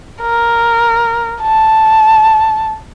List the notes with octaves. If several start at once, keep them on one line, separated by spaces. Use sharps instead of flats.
A#4
A5